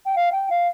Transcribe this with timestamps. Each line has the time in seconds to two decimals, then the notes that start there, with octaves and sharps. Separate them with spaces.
0.06 G5
0.16 F5
0.32 G5
0.50 F5